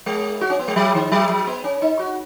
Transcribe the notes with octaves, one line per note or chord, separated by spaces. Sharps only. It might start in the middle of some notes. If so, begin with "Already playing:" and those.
G#3
F#4
C#4
B3
G#3
F#3
D#3
F#3
F#3
B3
C#4
D#4
F#4